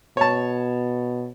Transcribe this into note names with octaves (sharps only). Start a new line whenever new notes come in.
B2 C#5 A5